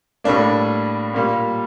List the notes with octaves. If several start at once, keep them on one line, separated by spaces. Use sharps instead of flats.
A2 G3 A#3 D4
A#2 G3 A#3